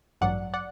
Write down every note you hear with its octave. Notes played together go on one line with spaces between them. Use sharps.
A1 G2 F#3 D5 F#5
D5 F#5